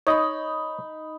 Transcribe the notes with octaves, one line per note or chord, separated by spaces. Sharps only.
D#4 C#5 D#5 B5